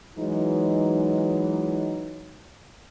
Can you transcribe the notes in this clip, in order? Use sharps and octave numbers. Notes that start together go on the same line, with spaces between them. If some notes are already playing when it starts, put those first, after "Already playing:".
E3 F#3 G#3 D#4